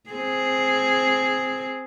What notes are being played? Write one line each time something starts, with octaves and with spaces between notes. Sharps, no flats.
C4 G#4